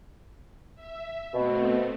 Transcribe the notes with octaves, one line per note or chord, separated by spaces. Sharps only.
E5
B2 A3 B3 C4